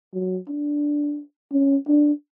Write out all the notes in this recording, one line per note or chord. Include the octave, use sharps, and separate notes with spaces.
F#3
D4
C#4
D4